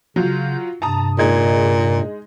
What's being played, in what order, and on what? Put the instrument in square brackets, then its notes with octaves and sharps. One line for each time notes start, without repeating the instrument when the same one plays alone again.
[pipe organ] C#3 G6 [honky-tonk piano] F#3 F4
[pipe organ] G2 C3 [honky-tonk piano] A5 A#5 D#6
[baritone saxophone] A#2 [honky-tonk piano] G#3 D#4 G#6